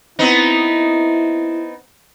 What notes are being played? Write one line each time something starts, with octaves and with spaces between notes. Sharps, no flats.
B3 C4 D#4 E4